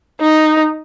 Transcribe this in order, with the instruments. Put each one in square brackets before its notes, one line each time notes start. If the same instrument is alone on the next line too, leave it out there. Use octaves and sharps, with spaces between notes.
[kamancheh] D#4